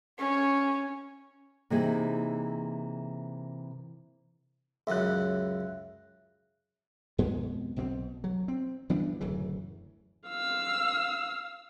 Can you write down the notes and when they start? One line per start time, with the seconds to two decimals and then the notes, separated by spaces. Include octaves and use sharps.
0.19 C#4
1.70 C3 E3 A#3 D#4 E4 G#4
4.87 C#2 F#2 C#3 E5 F#6
7.18 F2 B2 G#3 B3
7.76 B1 B2 G3 C4
8.24 F#3
8.48 C4
8.90 E3 G3 B3 D4
9.20 D1 F#2 C#3 E3
10.29 F5 E6